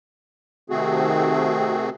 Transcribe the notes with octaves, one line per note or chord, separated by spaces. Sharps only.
C3 D#3 A3 C4 F#4 G#4